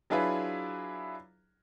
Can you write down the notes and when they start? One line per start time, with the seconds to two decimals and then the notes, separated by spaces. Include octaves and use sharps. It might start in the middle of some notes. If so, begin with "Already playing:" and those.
0.10 F#3 D4 E4 F4 G#4 B4